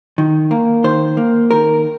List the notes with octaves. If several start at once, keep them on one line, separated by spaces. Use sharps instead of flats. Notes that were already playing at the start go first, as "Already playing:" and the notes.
D#3
A#3
D#3 C5
A#3
D#3 A#4